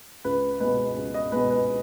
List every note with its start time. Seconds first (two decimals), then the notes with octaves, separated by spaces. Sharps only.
0.25 C#2 B4
0.60 B2 G#3 B4
0.97 C#2
1.14 D#5
1.32 B2 G#3 B4
1.50 B4